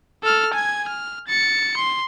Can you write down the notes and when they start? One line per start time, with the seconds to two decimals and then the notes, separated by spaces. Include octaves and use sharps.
0.23 A4 F6
0.53 G#5 G#6
0.88 F6
1.27 A6 C#7
1.76 C6